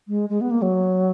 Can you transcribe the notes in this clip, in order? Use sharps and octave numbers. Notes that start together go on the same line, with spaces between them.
G#3
G#3
B3
A#3
F#3